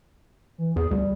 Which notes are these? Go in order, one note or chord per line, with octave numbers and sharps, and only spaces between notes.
E3
E2 G#4
D2 G3